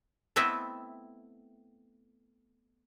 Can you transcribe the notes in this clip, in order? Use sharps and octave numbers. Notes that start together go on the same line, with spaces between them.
A3 B3 C4 E4 D#5 E5